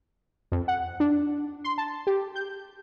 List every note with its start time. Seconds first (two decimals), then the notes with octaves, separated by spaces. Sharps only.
0.52 F2
0.68 F#5
1.00 D4
1.64 C6
1.78 A5
2.07 G4
2.35 G6